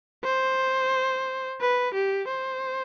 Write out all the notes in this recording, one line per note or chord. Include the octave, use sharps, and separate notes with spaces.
C5
B4
G4
C5